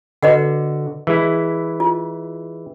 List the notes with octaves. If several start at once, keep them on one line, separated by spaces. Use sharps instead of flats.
D3 F#4 B4 D#5 F#5
E3 G#3 E4
F4